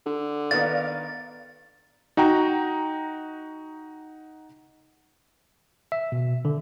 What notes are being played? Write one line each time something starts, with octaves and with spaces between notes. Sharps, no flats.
D3
D#3 B3 D#4 D5 F5 A6
D#4 F#4 G5 A#5
E5
B2
D3